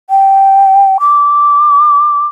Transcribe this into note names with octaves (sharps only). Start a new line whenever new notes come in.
G5
D6